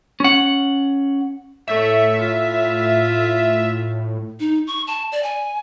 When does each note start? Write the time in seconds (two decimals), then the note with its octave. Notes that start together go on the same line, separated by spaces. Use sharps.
0.20 C#4 F#5
1.68 A2 A3 C#5 E5
2.19 F4
4.40 D#4
4.67 C#6
4.87 A5
5.12 D5
5.23 G#5